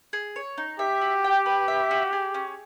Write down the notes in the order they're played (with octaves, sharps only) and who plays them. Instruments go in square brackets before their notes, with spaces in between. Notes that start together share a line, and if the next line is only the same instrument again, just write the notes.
[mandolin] G#4
C#5
D#4
[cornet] G4 [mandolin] E5
[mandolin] F#4
G5
B4
E5
F#4
G#4
C#4